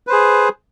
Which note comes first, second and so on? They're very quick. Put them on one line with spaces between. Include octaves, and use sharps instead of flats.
B4 C5 G#4